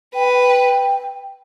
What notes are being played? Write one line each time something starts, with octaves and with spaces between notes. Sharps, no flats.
B4 G5
G5